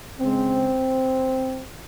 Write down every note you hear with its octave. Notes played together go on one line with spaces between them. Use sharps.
C#3 G#3 C4